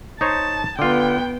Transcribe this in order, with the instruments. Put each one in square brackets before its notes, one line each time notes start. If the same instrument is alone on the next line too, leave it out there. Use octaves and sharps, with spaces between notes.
[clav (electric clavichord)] D#4 C5 C#5 [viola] A5
[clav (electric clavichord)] D3 F4 [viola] B3 G5